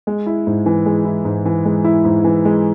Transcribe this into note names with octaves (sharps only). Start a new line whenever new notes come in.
G#3
E4
G#2
E3
G#3
E4
G#2
E3
G#3
E4
G#2
E3
G#3